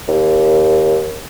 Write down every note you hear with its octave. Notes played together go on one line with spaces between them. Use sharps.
D#2